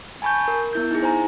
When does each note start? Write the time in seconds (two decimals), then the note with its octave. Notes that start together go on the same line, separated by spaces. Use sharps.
0.22 G#5 A5 B5 C#6 G6
0.48 A#4
0.73 B3 E4 G6
0.91 D#4 E4 G#4
1.02 C5 G#5 A#5